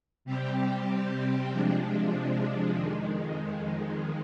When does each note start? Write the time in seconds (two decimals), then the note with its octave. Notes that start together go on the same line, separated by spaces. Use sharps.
0.25 C3 G3 C4 G4
1.50 C3 F3 G#3 D4
2.75 F2 D#3 G#3